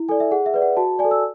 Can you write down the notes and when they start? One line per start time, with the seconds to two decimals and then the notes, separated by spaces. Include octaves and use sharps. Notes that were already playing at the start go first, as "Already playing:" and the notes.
Already playing: E4
0.09 A4 D5 G#5
0.20 E5
0.31 G#4 F#5
0.46 E5
0.54 B4 D5
0.62 F#5
0.77 F#4 A5
0.99 D5 G#5
1.04 A4
1.11 E6